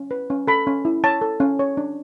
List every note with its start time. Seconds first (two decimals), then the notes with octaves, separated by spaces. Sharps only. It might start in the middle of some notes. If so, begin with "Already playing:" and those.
Already playing: C#4
0.11 B4
0.30 C#4
0.47 A4 B5
0.67 C#4
0.85 E4
1.04 C#5 A5
1.21 A4
1.40 C#4
1.59 C#5
1.77 D4